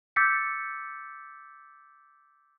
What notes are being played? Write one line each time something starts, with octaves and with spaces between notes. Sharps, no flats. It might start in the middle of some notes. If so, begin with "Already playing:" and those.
D6 E6 G6 A6 B6 C#7